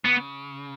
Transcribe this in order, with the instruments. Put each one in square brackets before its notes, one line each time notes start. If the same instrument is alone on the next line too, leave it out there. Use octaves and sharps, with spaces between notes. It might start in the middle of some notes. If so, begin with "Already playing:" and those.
[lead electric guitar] C#3 [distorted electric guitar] B3